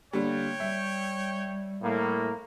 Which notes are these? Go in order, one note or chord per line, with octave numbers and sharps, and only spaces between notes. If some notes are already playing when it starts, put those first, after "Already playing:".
D3 G3 A#3 C#5 G5
G3 E5
A2 A#3